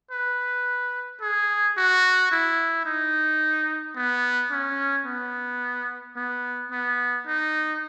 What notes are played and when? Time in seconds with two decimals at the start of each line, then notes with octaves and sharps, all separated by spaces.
0.12 B4
1.21 G#4
1.77 F#4
2.32 E4
2.86 D#4
3.96 B3
4.52 C#4
5.06 B3
6.17 B3
6.71 B3
7.27 D#4